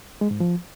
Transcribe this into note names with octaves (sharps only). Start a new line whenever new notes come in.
G#3
G#2
F3